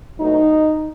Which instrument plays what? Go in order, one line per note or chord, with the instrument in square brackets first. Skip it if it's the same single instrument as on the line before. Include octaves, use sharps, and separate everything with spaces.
[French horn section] B2 F#3 A3 D#4